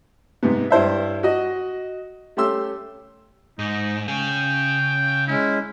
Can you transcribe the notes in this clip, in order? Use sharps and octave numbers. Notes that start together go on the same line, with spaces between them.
G#2 C3 B3
G2 E4 C5 E5
F#4 D#5
A3 C#4 G4 C6 E6
G#2 D#4
C#3 G#4 G5
G#3 C#4 E4